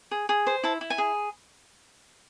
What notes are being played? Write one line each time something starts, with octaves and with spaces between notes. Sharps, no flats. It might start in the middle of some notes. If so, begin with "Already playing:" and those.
G#4
G#4
C5
E4 A5
E4
G#5
G#4